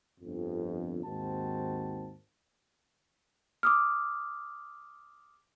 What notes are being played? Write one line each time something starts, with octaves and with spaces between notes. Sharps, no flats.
G1 F2
D#2 G#2 D#3 C4 F#4 A5
D6 D#6 F6